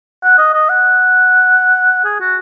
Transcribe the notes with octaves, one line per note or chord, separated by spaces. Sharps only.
F#5
D#5
D#5
F#5
G#4
F#4